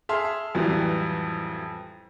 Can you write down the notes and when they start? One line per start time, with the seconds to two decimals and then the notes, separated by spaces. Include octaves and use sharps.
0.09 G#4 E5 A5 C6 F6
0.55 A1 F2 E3 F#3 G3